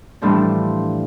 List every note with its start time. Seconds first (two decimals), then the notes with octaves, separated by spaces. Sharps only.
0.22 A2 E3 F3 G3 D4